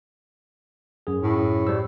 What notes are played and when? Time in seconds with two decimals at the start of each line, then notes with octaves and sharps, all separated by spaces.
1.07 F#2 G#4
1.22 A2
1.67 G3 C5 E6